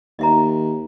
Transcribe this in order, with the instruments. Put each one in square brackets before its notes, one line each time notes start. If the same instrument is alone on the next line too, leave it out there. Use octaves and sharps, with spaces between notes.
[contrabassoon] D#2 [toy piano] D#5 E5 A#5